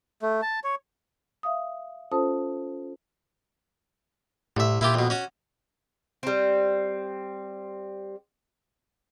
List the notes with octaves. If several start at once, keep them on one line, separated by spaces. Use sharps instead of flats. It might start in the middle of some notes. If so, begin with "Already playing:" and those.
A3
A5
C#5
E5 F5 D#6
C#4 F4 A4 C5 A5 D#6
C2 A2 E5
A#2 E4 F4 G4
F2 B2
C#4 F#4
G3 C4